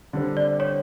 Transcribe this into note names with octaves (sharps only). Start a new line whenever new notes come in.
D3 G3 C4
D5
C#5